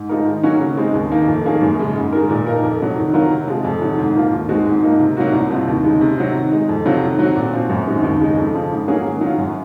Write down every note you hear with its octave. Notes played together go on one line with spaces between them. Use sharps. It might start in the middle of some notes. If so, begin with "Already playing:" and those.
Already playing: G#2
F3 G#3 D#4 A#4
D#3
F#3 A#3 C#4 F#4
C#3
G#3 C4 D#4
D#2
D#3 A#3 D#4
F2
D#3 A#3 C#4 G#4
F#2
C#3 G#3
G#2
D#3 G#3 D#4 A#4
A#2
F3 A#3 D#4 A#4
F2
C3 F#3
D#3
F#3 C4 F4 A#4
C3
F3 G#3
F2
C3 D#3 F#3
G#2
F3 A#3 F4
D#2
D#3 G#3 C4 F#4
G#2
F3 A#3 D#4
C3
F#3 A#3 D#4 F#4
C2
C3 F3 C4 F4
D#2
C#3 G#3 D#4
C3
F#3 C4
D#3
G#3 D#4
F2
C3 F#3 C4 F4
D#3
F#3 C4 F#4
A#2
F3 C4 F#4
F#2
D#3 G#3 C4 F#4
D#2
C#3 G#3 D#4
F2
C#3 F3
G#2
F#3 A#3 C#4 G#4
D#3
F#3 C#4 F4
F#2